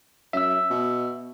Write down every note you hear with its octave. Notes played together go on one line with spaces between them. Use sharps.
F#2 E5 E6
B2